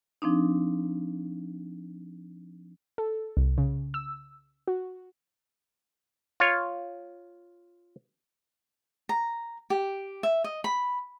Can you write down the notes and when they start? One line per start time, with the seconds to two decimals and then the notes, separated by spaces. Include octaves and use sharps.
0.22 F3 C4 D4 D#4
2.98 A4
3.37 C2
3.58 C#3
3.94 E6
4.68 F#4
6.40 F4 C#5
9.09 A#5
9.70 G4
10.23 E5
10.44 D#5
10.64 B5